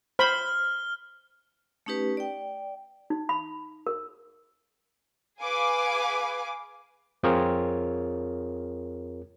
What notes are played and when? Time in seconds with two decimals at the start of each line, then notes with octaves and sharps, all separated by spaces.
0.19 C5 B5 F6 G7
1.86 A3 C#4 D#4 G4 B4
2.17 D5 G5
3.10 D#4
3.29 B5
3.87 A#4
5.40 G#4 B4 F5 G#5 D6
7.23 F2 C4 F4 G#4 A#4 C#5